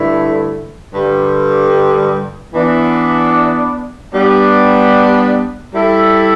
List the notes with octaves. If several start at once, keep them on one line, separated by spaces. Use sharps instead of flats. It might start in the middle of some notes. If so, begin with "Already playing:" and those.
Already playing: G2 D3 A3 E4
G2 D3 G3
E3 B3 D4
G3 B3 D4
G3 E4 A4